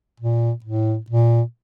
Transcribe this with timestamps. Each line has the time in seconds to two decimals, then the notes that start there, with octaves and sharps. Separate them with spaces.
0.20 A#2
0.65 A2
1.10 A#2